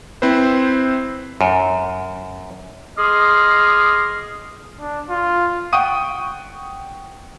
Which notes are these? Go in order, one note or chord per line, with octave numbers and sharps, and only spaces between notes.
C4 E4 B4 C5
F#2
G#4 D#5 C6 D6 D#6 F6
D4
F4
F#5 G5 C#6 D#6 D#7